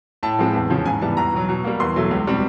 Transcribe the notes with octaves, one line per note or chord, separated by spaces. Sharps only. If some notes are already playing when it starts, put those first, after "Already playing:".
A2 A5
F3 G#3 C4
E2
C#3 F3
G#2 G#5
E3 G3 B3 A5
E2 A#5
B2 F#3
B2
G3 A#3
E2 C6
B2 F#3 A3
C#2
B2 G3 C4